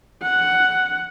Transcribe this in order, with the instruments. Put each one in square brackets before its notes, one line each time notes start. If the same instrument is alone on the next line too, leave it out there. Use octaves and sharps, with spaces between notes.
[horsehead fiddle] F#5